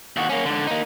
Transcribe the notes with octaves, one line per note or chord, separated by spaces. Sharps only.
D#2 F#4
A#3 C#4
G#2 D3
A#3 D#4